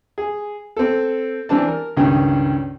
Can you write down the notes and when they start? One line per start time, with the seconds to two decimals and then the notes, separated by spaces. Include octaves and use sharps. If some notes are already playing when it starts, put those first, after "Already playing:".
0.18 G#4
0.76 C4 A4
1.49 E3 C4 D4 A5
1.67 A#4
1.97 C#2 G2 D#3 C#4 D#4